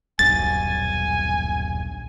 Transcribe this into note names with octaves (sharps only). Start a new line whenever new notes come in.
D#1 B1 G2 G#5 A6